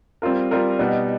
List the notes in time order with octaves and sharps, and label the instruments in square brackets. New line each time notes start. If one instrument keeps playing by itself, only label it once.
[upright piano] G3 C4 F4 A#4
G3 C4 F4 A#4
B2 G3 B3 D#4